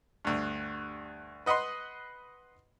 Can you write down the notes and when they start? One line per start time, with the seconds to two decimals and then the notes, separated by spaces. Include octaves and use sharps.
0.25 D2 G2
1.46 B4 D#5 F#5 B5 C6